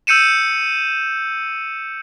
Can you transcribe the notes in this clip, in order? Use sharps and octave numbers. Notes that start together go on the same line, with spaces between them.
E6 G6 C#7 D#7 E7